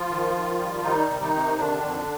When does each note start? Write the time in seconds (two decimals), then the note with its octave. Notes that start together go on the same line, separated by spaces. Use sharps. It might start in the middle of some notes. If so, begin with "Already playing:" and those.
Already playing: F3 F4
0.10 D#3
0.35 D#3
0.59 G3
0.84 D#3 G3 D#4
1.09 C3
1.21 D#3 D#4
1.34 C3
1.58 D3 D#3 D4
1.83 F2